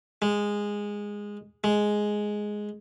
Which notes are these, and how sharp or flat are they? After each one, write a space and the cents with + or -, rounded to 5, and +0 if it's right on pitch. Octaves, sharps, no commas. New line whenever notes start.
G#3 -10
G#3 +5